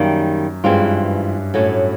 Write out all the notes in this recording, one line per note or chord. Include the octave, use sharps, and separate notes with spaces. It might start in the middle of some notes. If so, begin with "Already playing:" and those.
Already playing: F#2 D#3 G3 A#3
G2 E3 G#3 C4 F4
A2 F#3 A3 C#4